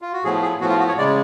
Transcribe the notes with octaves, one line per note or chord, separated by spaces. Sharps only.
F4
F#4
A2 F3 B3 G#4
G#4
A2 F3 B3 F#4
F4
F#4
C#5
C#3 G#3 D5